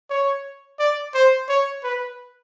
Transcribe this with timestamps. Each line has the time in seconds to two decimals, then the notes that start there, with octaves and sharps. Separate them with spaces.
0.10 C#5
0.79 D5
1.14 C5
1.49 C#5
1.83 B4